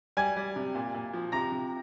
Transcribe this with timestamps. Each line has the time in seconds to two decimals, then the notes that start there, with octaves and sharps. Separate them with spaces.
0.17 G3 G#5 G#6
0.36 G3
0.56 C3
0.75 A#2
0.94 A#2
1.13 F3
1.32 C3 A#5 A#6
1.52 C3